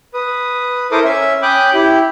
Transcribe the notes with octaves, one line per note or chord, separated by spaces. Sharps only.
B4 D#6
E4 A4 A#4 C5 D6 D#6
C#4 E5
C#4 G5 B5 D6 D#6 F#6
E4 G4